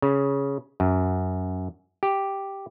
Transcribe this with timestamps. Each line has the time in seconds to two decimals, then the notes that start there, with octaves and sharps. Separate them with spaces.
0.02 C#3
0.80 F#2
2.03 G4